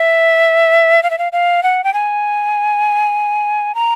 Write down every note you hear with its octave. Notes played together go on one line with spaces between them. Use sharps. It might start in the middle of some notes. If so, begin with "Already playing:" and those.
Already playing: E5
F5
E5
F5
F5
F#5
G5
G#5
A#5